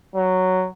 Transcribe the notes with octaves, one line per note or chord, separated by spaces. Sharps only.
F#3